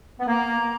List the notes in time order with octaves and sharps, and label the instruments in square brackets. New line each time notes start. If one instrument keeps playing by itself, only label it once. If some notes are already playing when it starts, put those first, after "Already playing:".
[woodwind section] B3
[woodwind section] A#3 [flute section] A#5